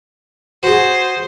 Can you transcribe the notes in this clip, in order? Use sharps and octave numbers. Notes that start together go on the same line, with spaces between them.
F#4 G#4 C5